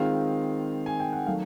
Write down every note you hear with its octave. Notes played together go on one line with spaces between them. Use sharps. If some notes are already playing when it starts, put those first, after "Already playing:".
Already playing: D#3 G#3 C4 F4 F5
G#5
G5
F#5
D#3 F#3 A3 F5